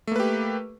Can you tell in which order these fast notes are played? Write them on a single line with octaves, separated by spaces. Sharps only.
A3 A#3 B4 G4